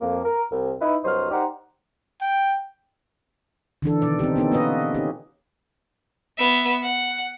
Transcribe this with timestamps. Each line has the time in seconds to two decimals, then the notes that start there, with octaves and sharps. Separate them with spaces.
0.01 F2 A#3
0.25 A#4
0.52 C2
0.82 D#4 E4 B4
1.05 C2 G2 F#3 C5 D#5 F6
1.31 D#4 G4 C5 D5 F#5 A#5
2.21 G5
3.82 D3 E3 D4 A4
4.02 B2 D#3 D5
4.19 C4 C#4 D#4 G4
4.36 B3 C#4 D#4 A4
4.52 A#3 F4 B4 D#5
4.95 C#4 D#4 G4
6.38 B3 E5
6.82 F#5